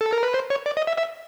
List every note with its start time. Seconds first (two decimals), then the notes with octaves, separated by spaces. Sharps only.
0.01 A4
0.13 A#4
0.23 B4
0.34 C5
0.50 C#5
0.66 D5
0.77 D#5
0.87 E5
0.98 E5